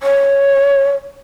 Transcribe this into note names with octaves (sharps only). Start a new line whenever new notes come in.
C#5